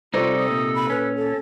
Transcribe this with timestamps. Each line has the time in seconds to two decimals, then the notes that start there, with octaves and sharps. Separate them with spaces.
0.14 C2 C3 D#4 F4 A4 C5 D5
0.37 D#6
0.51 A#2
0.75 B5
0.90 C#4 B4
1.16 A4